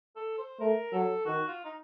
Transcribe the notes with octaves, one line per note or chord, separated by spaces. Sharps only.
A4
C5
A3 A#4
F#3 A4
D#3 F#4
F4
D#4